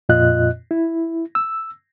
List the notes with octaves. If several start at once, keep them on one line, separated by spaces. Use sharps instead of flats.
F2 A#2 F4 D#5 F#6
E4
E6